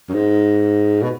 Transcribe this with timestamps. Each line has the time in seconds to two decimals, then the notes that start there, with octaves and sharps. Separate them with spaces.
0.09 F#2
0.14 G#2
1.02 B2